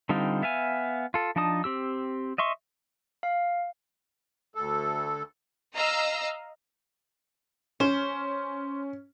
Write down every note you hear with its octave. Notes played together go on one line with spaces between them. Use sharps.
D3 G3 C4 D#4 F4
B3 E5 F5 G#5
F4 A4
F3 D4 D#4 A5 D#6
C4 G4 E6
D#5 E5 C6 C#6
F5
D2 A4
D#5 F5 A#5 E6
C#4 C5